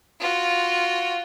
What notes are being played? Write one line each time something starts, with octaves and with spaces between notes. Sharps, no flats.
F4 F#4